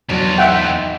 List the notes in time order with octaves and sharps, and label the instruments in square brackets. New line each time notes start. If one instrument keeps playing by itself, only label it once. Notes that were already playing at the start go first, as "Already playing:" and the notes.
[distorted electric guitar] E2 F4 [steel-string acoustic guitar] F#3 B3 D4
[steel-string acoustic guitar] D#4 [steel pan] E5 F#5 G5